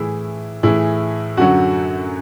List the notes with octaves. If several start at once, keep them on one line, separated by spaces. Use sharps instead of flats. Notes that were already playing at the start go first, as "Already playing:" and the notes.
Already playing: A2 E3 E4 G#4
A2 E3 E4 G#4
F#2 D3 F#3 F#4